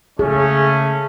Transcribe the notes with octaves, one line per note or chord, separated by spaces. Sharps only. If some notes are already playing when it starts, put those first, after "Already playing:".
C#3 A3 C#4 G#4